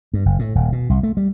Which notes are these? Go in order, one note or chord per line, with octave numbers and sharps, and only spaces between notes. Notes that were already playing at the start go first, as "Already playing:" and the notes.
G2
F#1
A2
D#1
B2
C2
A3
G3